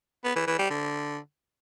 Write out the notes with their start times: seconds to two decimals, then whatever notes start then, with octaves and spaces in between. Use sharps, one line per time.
0.24 B3
0.36 E3
0.47 E3
0.59 G3
0.70 D3